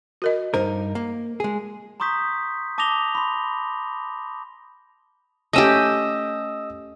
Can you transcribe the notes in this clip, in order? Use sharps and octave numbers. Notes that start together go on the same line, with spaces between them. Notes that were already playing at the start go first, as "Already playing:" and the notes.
F#4 A#4 D#5
G2 D#4 A#4 C5
A#3
G#3 G#4
A#5 C6 C#6 D#6 G6 B6
A5 D6 D#6 A#6 F7 G7
B5 C6
A3 C#4 G4 D#5 D#6 E6